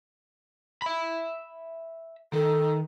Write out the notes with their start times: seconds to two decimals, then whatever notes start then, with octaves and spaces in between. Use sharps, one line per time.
0.82 E5 B5
2.33 D#3 A4